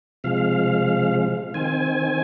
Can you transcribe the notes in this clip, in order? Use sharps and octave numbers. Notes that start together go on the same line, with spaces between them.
C3 F3 G#3 F5
D#3 C4 G#5